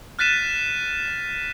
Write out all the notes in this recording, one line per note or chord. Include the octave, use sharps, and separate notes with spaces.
F6 F#6 A6 B6 D#7 E7